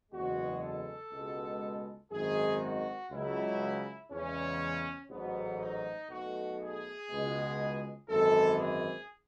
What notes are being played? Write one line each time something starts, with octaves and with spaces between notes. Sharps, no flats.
F#1 E2 B2 G#3 F#4
A4
C#2 B2 G#3
G#1 F#2 D#3 G#3 G#4
F#4
C#2 C#3 F#3 E4
E2 C#3 G#3 C#4
A1 G#2 F#3 B3
D#4
B1 B2 A3 F#4
G#4
C#2 B2 G#3
G#1 F#2 E3 G#3 A4
G#4